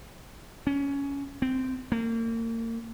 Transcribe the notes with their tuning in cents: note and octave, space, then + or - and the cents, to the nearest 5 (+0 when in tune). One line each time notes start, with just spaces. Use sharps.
C#4 +15
C4 -15
A#3 -35